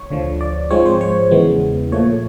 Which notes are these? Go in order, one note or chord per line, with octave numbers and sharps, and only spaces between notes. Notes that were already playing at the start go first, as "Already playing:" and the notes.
Already playing: C#5
D2 D3 F3
D5
G#2 F3 G#3 C4 C#5
C5
C#5
E2 C#3 E3 G#3 B3
A#2 F3 A3 C#5